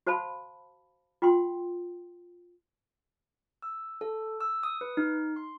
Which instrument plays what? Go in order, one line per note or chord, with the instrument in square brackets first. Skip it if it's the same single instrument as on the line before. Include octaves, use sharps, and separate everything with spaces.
[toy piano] F#4 C5 F5 A5 B5
F4 F#5 G5 C6
[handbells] E6
A4
E6
D#6
B4
D#4
C6